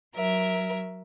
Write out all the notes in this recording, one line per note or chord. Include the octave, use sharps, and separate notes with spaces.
F#3 A#4 E5